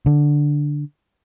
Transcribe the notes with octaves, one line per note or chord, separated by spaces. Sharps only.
D3